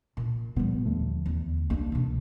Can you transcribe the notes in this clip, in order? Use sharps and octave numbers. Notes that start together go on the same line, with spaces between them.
A#2
A#2 F3 G3 B3
D#2 D3 A3
E2
C2 A#3 D4
A1 B2